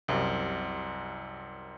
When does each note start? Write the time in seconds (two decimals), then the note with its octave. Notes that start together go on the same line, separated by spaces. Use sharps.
0.08 C2 F#2 C3